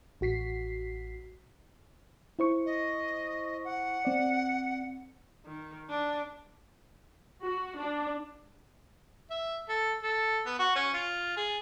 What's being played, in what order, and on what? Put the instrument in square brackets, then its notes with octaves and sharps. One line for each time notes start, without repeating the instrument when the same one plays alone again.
[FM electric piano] A1 F#4 B6 C7
E4 C5 C#6
[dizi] D#5
F#5
[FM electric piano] C4 D5
[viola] D#3
D4
[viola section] F#4
D4
[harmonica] E5
A4
A4
B3
F#4
C#4
F4
G#4